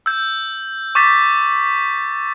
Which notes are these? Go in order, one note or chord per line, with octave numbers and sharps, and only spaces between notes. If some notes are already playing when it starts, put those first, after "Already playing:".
E6 G6
C#6 D6 G6 A6 B6